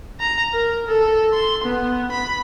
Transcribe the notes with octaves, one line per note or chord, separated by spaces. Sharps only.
A#5
A#4
A4
C6
B3
B5